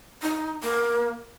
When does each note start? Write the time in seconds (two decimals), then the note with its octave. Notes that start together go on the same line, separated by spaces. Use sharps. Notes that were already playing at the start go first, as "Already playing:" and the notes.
0.22 D#4
0.63 A#3